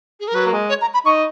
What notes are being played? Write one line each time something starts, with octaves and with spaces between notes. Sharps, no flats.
G#4
A#4
F#3 B4
A#3
G#3
C#5
A#5
B5
D#4 C#6